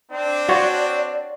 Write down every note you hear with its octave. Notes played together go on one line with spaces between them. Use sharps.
C4 D4 D5
F4 F#4 C#5